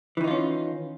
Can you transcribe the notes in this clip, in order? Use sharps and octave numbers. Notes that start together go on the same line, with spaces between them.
D#3 E3 C#4 D#4 F4